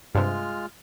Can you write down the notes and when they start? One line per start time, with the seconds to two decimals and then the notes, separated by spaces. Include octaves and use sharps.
0.15 G2 C3 G#3 F4 F6